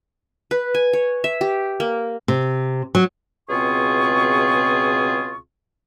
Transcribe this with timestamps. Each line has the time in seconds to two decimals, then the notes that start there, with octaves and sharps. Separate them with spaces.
0.51 B4
0.75 G#5
0.93 C#5
1.24 E5
1.41 G4
1.80 A#3
2.28 C3
2.95 F#3
3.48 C#2 B2 C4 F4 G#4 C#6